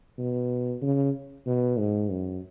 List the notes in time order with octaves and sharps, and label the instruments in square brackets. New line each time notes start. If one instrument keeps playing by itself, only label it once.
[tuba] B2
C#3
B2
G#2
F#2